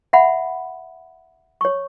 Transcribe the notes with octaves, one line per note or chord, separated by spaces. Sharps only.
E5 F#5 B5
C#5 C#6